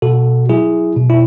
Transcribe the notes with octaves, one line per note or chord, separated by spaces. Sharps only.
B2 F#4 A4
F#3 E4 G#4
B2
E4